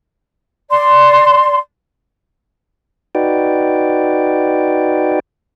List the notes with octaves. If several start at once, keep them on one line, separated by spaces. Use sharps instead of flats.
D5 C6
D#4 F#4 B4 D5 G5